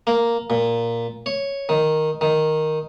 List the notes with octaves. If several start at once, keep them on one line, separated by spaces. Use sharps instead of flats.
A#3
A#2
C#5
D#3
D#3